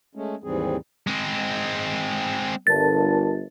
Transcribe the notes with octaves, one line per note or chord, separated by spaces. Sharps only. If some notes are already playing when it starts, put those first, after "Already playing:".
G#3 A3 C#4
D#2 G#2 E3 G3 C4 G#4
G#3 C4
G1 A#4 D5 A5 A6